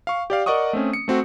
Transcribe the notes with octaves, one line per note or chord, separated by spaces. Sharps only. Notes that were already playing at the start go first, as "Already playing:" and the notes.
F5 C#6
G4 D5 F5
A#4 D5 D#5 F#5 C#6 D#6
A3 C4 C#4
C#7
A3 C4 F#4